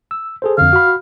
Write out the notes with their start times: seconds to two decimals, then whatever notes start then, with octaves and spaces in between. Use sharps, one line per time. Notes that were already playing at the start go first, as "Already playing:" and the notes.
0.11 E6
0.42 G#4 A4 C5
0.58 F2 D3 F5
0.73 F#4 B5